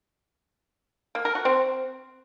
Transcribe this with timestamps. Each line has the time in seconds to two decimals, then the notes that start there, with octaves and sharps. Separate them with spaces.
1.15 A#3
1.25 A#4
1.35 F#4
1.45 C4